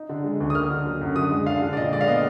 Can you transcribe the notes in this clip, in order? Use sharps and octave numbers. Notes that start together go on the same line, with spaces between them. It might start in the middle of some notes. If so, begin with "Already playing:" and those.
Already playing: D#4
D3
G#3
D2
D#6
A#3 F6
D3
F#3
F#2
D3 D#6
G#3
D4 F5
D3
D5
A#2 D#5
G#3 D5
F5
B3 D#5